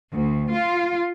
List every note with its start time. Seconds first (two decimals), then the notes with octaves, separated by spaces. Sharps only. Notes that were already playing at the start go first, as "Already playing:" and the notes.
0.12 D2
0.55 F4